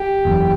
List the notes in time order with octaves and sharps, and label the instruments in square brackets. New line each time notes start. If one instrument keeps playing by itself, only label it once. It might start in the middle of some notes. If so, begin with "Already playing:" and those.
Already playing: [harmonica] G4
[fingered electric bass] F#1 E2 C#3